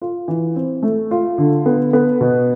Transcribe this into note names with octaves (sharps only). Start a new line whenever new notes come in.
F4
E3
C4
A3
F4
D3
B3
B3
B2